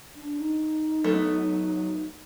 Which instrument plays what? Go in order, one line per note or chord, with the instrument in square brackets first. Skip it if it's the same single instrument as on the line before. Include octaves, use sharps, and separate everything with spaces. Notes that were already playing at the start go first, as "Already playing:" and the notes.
[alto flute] D4
D#4
[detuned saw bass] F#3 [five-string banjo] A3 B3